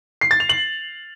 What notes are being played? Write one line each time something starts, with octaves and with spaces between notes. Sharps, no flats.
C7
A6
F7
F#7